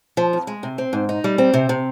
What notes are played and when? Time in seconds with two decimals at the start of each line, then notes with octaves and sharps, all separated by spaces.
0.17 F3
0.33 F2
0.47 G#3
0.63 C3
0.78 C4
0.93 G#2
1.09 D#4
1.24 G3
1.38 C4
1.54 C3
1.69 C3